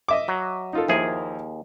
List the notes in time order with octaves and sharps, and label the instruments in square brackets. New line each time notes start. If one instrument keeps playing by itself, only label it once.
[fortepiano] D#5 E5 D6
[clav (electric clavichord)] F#3
[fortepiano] D#4 F4 A4
[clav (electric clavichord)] D#2 G#4 [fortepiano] F3 E4 A#4